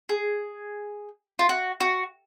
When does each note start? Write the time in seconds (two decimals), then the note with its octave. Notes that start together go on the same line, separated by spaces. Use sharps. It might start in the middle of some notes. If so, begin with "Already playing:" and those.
0.09 G#4
1.39 F4
1.49 F#4
1.80 F#4